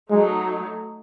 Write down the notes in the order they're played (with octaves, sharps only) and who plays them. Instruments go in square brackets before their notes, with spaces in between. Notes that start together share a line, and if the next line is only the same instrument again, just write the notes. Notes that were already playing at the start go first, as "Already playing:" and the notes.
[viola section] F#3 A3 D#4 [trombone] G#3